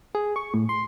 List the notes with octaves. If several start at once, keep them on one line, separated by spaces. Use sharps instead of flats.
G#4
C#6
A2
C6